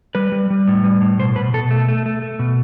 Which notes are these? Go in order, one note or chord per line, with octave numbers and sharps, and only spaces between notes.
G3 B4
G3
G3
A2
G3
A2
B2 C5
B2 B4
B2 A4
A3
A3
A3
A3
B2